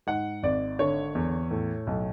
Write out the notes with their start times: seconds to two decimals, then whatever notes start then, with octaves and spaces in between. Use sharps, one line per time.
0.07 G#2 F#5
0.43 G#1 D5
0.79 D3 C#5
1.15 E2
1.51 A2
1.87 B1